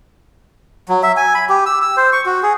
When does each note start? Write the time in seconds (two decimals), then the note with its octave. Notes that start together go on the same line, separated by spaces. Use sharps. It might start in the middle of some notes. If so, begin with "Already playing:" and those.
0.89 F#3
1.03 E5
1.17 G#5
1.35 B5
1.49 G4
1.66 E6
1.82 E6
1.97 C5
2.13 C#6
2.26 F#4
2.43 G#4